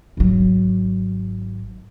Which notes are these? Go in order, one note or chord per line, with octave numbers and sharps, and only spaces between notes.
G#1 F#3